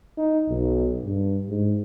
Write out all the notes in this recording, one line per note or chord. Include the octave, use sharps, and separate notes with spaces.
D#4
B1
G2
G#2